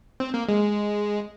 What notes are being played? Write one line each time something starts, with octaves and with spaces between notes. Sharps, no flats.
C4
A#3
G#3